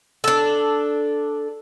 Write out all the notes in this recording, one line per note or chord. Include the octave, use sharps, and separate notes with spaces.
D4 A4